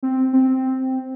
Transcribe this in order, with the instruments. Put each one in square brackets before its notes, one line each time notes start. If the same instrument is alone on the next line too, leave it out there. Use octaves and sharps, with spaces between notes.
[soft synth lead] C4
C4